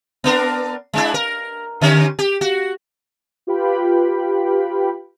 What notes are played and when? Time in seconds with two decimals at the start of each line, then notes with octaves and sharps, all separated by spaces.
0.24 B3 D4 A#4
0.94 G#3 D4 E4
1.14 A#4
1.81 D3 C#4 G4
2.19 G4
2.41 F#4
3.47 F4 G4 B4 F5 G5 B5